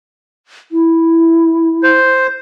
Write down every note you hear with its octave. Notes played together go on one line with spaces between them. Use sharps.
E4
C5